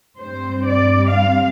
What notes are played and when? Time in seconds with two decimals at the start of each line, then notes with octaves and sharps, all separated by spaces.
0.19 G2 G3 C4 C5
0.65 D5
1.10 F5